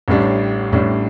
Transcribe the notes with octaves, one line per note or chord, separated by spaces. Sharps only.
A1 A2 G3 D4
A1 A2 G3 D4